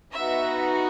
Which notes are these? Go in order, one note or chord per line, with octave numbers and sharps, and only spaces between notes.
B3 D#4 F#4 E5